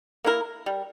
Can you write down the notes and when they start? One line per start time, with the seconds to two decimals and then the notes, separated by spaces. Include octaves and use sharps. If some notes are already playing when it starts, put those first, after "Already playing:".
0.24 A#3 E4 A#4
0.66 G3